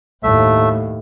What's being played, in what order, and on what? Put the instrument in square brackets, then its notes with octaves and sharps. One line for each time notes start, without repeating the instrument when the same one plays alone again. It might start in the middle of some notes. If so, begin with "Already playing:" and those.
[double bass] D#2 A2 [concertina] A3 E5